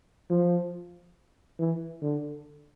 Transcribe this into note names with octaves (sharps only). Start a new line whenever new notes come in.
F3
E3
D3